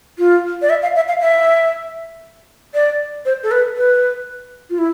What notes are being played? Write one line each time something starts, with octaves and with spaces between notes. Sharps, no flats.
F4
D5
E5
F5
E5
F5
E5
D5
C5
A4
B4
B4
F4
E4